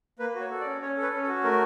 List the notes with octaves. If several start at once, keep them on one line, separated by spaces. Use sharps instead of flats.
A#3 B4
F#4 C#5
A4
D5
C#4
C#4 C#5
A4
B4
C#4
A4
F#4
A3 A#4